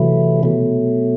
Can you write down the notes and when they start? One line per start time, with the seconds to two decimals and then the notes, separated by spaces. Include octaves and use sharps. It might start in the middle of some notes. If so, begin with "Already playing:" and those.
Already playing: C3 E3 F#3 A3 E4
0.43 B2 F#3 A3